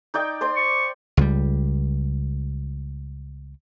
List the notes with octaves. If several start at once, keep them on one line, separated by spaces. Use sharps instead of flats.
D#4 D5 G5
C5 D5 C6
C#6
C#2 G3